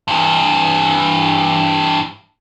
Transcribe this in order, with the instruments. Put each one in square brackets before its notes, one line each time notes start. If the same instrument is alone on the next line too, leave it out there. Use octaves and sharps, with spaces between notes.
[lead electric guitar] G2 E3